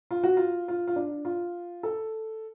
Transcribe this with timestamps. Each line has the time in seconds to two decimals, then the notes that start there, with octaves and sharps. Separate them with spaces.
0.11 F4
0.23 F#4
0.37 F4
0.68 F4
0.87 F4
0.96 D4
1.25 F4
1.83 A4